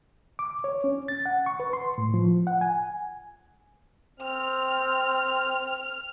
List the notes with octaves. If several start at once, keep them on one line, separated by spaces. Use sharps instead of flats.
D6
C#5
C#4
A6
F#5
C#6
B4
C6
A2
F3
F#5
G#5
C4 F6